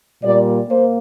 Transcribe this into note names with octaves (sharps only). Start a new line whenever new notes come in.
A#2 G3 A#3 D5
A#3 C5